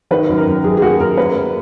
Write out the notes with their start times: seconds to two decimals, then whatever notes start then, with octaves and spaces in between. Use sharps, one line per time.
0.11 D#3 B4
0.29 F#2
0.38 A#4
0.47 F#2
0.64 F#2 G#4
0.77 G#4
0.82 A#3 F#4
1.00 F#2 A#4
1.17 A#3 B4
1.36 A#3